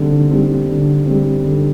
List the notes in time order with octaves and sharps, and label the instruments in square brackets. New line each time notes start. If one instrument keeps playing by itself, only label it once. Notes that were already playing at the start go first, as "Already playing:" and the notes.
Already playing: [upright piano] D3 G3 C4
G3 C4
D3
G3 C4
D3